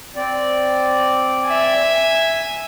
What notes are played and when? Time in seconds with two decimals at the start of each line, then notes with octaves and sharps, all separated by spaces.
0.16 C4 D5
1.46 E5 G#5